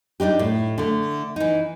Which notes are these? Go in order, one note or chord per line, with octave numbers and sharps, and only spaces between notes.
G3 D4 D#4 G4
A2
D3 A3
E3 D#4